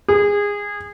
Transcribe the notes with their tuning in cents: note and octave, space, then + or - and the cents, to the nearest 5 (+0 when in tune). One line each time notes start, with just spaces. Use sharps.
G#4 -20